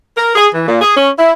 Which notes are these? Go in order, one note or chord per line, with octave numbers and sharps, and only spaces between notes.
A#4
G#4
E3
A#2
G#4
C#4
E4